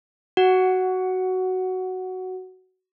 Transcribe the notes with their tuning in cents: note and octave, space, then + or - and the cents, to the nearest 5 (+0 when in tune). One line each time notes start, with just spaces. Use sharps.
F#4 +10 F#5 +0